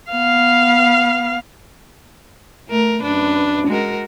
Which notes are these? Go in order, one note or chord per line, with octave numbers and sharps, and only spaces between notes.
B3 F5
A3 A#4
F#2 D4 B4
G#3 F#4 A#4